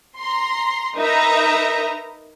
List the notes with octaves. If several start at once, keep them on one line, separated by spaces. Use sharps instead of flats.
A#5 C6
D#4 A#4 B4 D#5 E5 A#5